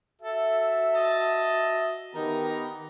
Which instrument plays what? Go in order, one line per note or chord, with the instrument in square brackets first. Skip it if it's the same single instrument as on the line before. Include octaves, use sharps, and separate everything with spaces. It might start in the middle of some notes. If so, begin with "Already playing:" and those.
[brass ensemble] F#4 E5 [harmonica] A4
[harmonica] D#5 A5
[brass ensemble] D#3 B3 G4 [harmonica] D#4 A#4